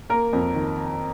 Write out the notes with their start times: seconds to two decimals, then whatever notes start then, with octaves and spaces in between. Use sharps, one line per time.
0.10 A#3 A#4
0.33 F2
0.54 D#3